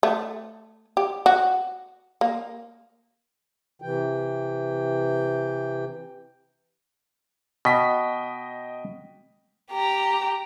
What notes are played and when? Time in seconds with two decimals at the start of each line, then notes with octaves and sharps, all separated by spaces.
0.03 A3
0.97 G4
1.26 F#4
2.21 A#3
3.82 C3 E3 G5
7.65 B2 D#5 G5 B6
9.71 G4 A#5